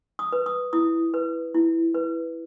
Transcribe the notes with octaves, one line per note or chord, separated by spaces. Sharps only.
D#6
B4
D#6
E4 D#6
B4
E4
B4